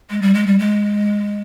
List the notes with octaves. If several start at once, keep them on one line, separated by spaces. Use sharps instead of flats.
G#3
G3
G#3
G3
G#3